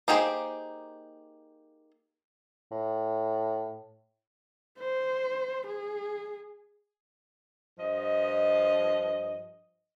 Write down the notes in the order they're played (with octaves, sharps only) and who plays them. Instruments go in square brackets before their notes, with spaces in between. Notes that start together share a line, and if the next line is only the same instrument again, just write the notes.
[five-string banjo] A#3 D#4 G4 G#4 C5
[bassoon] A2
[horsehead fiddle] C5
G#4
[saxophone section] G2 F3 D#5